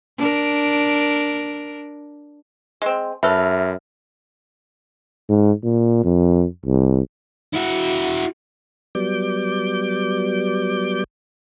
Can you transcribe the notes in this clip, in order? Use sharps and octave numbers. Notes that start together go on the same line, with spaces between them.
D4 A#4
G#3 C4
F#2 A4 B4 E5 F6
G#2
A#2
F2
C2
E4 F#4
F#3 G3 B3 D5 D6 G6